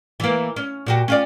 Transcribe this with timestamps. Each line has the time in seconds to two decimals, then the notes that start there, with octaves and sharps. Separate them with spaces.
0.20 E3 A#3
0.56 C#4
0.86 A#2 F#4 G4
1.08 C#4 F4 D5